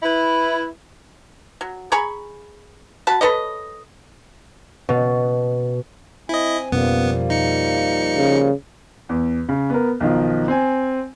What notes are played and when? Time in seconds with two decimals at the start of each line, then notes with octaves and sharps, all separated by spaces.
0.03 E4 B4
1.61 F#3
1.92 G#4 A#5 B5 C#6
3.07 F#4 A5 B5
3.21 A4 B4 C#5 D#5
4.89 B2
6.29 C4 E4 D#5 G#5
6.72 F2 B2 F3 G3 A#3 B3 C#4
7.30 D#4 C#7
8.17 C#3
9.09 E2
9.49 C#3
9.70 B3 A#4
10.00 B1 D#3 F3
10.48 C4 G#5